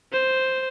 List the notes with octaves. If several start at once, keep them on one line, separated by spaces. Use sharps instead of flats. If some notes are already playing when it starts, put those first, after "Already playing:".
C5